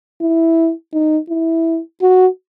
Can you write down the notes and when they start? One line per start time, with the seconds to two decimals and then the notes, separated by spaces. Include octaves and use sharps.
0.21 E4
0.93 D#4
1.29 E4
2.02 F#4